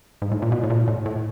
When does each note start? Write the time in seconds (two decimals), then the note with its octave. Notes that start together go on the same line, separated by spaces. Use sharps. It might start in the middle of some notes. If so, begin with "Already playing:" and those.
0.22 G#2
0.32 A2
0.42 A#2
0.52 B2
0.63 A2
0.70 A#2
0.88 A2
1.06 A2